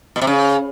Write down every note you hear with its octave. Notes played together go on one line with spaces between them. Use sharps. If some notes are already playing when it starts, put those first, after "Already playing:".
B2
C3
C#3